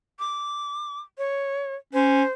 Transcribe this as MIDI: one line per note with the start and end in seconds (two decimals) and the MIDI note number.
0.19 1.00 86
1.18 1.75 73
1.93 2.23 61
1.93 2.32 72